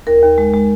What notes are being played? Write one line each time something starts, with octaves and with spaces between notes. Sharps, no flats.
D#2 A#4
D#2
G#3
G#3